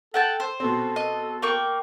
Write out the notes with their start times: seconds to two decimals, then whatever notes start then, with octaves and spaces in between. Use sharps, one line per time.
0.14 A4 F#5 G5 A5
0.40 C5
0.60 B2 C4 A4
0.96 D#5
1.42 A#3 G5 C#6